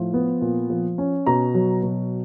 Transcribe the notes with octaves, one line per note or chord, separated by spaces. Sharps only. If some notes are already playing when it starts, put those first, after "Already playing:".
Already playing: A2 F3
B3
A#2
F3
C#4
B2 A#5
F#3
B2